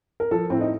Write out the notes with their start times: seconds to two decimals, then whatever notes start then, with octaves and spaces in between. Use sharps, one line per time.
0.20 A#4
0.31 F3 A4
0.50 A2 C4
0.61 D#4